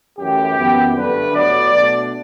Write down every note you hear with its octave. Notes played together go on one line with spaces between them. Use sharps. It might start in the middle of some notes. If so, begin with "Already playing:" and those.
F#2 E3 A3 G4
F#2 E3 B3
G2 D3 A3 D4 B4
A2 F#3 B3 D5
B2 A3 D4